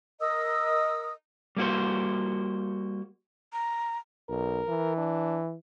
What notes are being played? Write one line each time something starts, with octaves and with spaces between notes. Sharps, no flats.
A#4 D#5 D#6 E6
G3 A#3 F#4 C5
A#5
B1 A#4
E3
D4